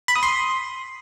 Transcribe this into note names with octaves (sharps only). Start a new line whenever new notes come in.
B5
D#6
C6